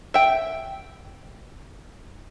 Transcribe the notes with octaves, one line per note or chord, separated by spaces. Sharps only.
E5 G5